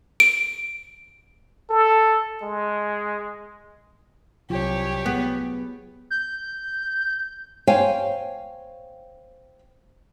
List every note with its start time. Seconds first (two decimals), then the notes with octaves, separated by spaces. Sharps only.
0.20 D7
1.70 A4
2.42 G#3
4.50 C2 F#3 F4 G4 C#5
5.06 B3 G#4
6.10 G6
7.67 C5 C#5 F5 G5 G#5